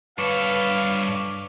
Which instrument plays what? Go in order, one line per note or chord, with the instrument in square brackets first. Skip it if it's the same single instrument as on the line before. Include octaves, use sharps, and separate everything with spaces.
[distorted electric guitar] G2 A4 [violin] B4 [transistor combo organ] C#5 D6 [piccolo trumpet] F5